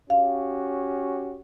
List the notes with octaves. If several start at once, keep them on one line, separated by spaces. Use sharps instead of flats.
C#4 F#4 G4 F5